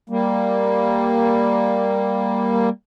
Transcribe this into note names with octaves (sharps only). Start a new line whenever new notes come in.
G3 A#3